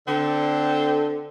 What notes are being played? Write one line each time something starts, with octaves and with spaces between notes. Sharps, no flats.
D3 C4